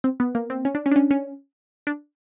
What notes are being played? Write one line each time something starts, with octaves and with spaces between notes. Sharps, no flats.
C4
B3
A#3
C4
C#4
D4
C#4
D4
C#4
C#4
D4